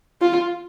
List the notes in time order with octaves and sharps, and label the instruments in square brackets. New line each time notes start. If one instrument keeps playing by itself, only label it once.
[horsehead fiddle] F4